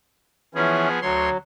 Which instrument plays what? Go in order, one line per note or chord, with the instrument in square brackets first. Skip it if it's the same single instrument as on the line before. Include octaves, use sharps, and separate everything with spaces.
[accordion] E3 C#4 [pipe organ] F3 B3 G#4
[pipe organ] D2 C#5 C6 [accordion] F#3